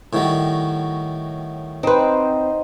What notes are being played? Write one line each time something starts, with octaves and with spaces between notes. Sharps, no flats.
A2 D#3 G3 F#4 C#5
C4 D#4 B4 C5